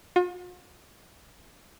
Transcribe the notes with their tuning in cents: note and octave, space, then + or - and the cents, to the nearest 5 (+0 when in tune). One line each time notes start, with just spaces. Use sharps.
F4 +45